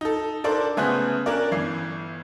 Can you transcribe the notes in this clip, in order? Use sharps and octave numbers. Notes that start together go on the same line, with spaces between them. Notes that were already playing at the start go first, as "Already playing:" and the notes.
D#4 A4
D4 A4 A#4 C5 D5 D6
C#3 A3 B3 C5 G#5 F#6
C#4 D4 A#4 D5
G1 E3 C7